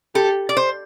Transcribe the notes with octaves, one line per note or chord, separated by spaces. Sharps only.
G4 A4
D5
C5